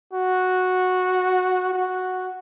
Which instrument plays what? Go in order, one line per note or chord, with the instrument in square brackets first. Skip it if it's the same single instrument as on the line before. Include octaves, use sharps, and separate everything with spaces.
[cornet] F#4
F#4